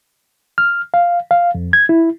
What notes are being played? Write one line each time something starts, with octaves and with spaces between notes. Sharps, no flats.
F6
F5
F5
F2
G#6
E4